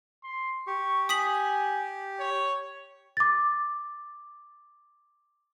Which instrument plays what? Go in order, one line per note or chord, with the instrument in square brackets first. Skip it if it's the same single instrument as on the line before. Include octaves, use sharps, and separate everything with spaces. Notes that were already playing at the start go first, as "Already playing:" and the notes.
[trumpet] C6
[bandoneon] G4 [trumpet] C#6
[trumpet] G#5 [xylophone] D#6 B6 F#7
[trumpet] C#5
[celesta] D6 A6